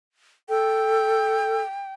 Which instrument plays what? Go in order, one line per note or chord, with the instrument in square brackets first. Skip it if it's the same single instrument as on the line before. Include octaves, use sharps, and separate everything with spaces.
[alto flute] A4 [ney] G5